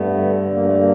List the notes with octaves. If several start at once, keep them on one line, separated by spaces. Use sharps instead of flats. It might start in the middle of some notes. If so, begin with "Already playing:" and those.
Already playing: G2 A3 B3
D3
G2 A#3
A3
A#3